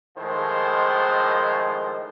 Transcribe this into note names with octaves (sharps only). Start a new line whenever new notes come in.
A2 D#3 F3 G#3 C5